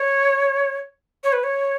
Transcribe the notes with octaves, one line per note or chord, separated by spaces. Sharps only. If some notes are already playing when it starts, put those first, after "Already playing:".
Already playing: C#5
C#5
B4
C#5